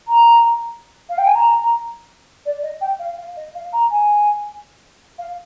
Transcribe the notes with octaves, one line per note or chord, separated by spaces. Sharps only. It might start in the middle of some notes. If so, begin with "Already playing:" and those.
A#5
F5
G5
G#5
A#5
D5
D#5
G5
F5
F5
D#5
F5
A#5
G#5
F5